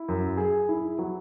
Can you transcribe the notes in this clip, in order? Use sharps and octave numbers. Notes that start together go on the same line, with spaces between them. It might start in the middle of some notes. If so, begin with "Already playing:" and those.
Already playing: E4
F#2
G#4
E4
F#3